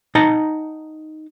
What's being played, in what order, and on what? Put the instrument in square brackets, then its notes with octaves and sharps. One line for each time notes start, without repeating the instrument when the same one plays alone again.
[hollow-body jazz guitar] D#4 F#5 A5 A#5